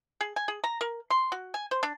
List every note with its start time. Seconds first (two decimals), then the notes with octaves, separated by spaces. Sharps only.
0.21 G#4
0.36 G#5
0.48 G#4
0.64 A#5
0.81 A#4
1.10 C6
1.32 F#4
1.54 G#5
1.71 C5
1.83 D4